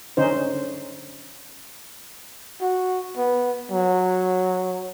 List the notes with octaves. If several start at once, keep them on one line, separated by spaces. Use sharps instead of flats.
D3 C#4 D#4 C5
F#4
B3
F#3